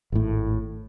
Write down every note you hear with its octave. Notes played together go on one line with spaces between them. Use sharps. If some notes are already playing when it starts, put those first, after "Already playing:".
G#1 A2